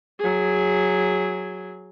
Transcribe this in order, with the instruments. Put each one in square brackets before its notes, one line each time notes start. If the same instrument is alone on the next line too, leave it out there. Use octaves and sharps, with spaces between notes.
[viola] F#3 G#4